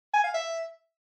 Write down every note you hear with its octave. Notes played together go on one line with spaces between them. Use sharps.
G#5
F5
E5